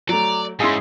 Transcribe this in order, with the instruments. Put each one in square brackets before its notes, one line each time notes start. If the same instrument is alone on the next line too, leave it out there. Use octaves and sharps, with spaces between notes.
[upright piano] F#3 A3 [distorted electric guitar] D5 [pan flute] A#5
[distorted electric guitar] G#2 [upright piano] C#4 E4 F5 [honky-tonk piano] G#4 C6 [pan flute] E6